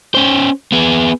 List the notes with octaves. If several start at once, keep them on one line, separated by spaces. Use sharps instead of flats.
C#4 C5
B3 G#4